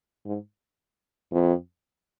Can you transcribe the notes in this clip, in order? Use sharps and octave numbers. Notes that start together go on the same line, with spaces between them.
G#2
F2